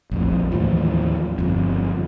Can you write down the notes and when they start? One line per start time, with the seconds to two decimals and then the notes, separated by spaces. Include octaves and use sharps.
0.11 A#1 F2 A2
0.52 D#2 A2 E3 F3
1.39 G1 F2